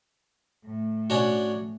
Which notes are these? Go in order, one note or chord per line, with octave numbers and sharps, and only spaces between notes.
A2
C#4 D4 F#4